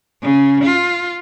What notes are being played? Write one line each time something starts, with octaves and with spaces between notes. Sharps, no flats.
C#3
F4